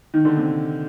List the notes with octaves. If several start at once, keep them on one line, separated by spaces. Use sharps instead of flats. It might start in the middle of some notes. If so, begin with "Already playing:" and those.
D#3
D3
C3